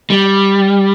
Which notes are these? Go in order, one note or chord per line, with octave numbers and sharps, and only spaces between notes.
G3